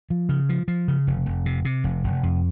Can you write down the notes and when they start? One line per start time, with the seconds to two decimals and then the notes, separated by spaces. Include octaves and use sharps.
0.10 F3
0.29 C#3
0.49 F3
0.68 F3
0.88 C#3
1.07 F1
1.26 F1
1.46 C3
1.65 C3
1.84 F1
2.04 F1
2.23 F2